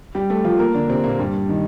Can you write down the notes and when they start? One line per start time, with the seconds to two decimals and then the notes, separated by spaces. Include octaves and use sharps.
0.15 G3 G4
0.30 A3 A4
0.44 F3 F4
0.59 A#3 A#4
0.74 D3 D4
0.90 C3 C4
1.04 A#2 A#3
1.19 G2 G3
1.49 D#3